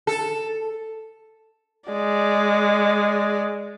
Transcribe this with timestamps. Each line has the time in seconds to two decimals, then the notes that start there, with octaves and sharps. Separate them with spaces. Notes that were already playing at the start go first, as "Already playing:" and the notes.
0.07 A4
1.90 G#3 D5